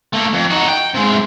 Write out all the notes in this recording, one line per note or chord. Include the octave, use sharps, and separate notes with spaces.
A3 A#3
F2
D#4 F#4
G5
C3 G#3